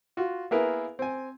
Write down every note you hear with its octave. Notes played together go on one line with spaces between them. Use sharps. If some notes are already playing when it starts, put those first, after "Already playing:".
F4 F#4
A#3 B3 E4 G#4 A#4 B4
C4 G#5